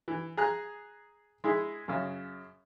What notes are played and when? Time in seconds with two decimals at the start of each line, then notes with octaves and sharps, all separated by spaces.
0.08 E3
0.37 G#4 A#5 F#6
1.44 G#3 E4 G#4
1.88 F#2 C#3